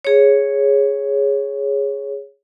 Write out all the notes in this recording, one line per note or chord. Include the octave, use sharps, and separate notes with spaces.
G#4 C#5